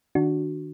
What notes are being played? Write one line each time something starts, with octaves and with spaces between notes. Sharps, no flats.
D#3 D4 F#4